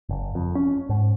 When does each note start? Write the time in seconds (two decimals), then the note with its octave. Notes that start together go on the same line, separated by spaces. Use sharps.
0.09 F#1
0.35 F2
0.55 C#4
0.89 G#2